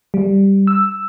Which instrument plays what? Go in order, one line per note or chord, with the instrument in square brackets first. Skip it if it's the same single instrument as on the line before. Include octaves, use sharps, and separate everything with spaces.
[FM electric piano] G3
E6